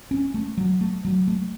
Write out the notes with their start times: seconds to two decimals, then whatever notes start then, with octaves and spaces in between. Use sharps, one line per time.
0.11 C#4
0.34 A3
0.57 F#3
0.81 A3
1.05 F#3
1.28 A3